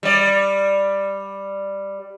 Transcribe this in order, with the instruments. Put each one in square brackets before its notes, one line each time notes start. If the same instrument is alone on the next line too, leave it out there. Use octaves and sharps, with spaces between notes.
[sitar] G3 D5